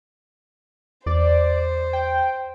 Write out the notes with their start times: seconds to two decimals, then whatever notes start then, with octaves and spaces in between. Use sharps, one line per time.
1.06 E2 C5 D5
1.93 G5